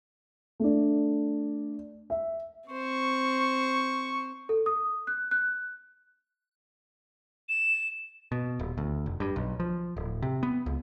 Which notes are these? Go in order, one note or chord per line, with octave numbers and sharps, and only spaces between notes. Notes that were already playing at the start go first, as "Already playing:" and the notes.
A3 D4
E5
C4 C5 C#6
A4
D#6
F#6
F#6
E7
B2
D#1
D2
F1
G2
B1
F3
D1
C3
B3
C#2